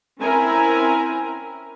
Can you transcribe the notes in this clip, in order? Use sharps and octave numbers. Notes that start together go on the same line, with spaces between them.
C4 C#4 E4 A#4 G#5 A#5